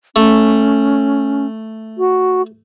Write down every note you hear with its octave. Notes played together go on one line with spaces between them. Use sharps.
A3 C#4
F#4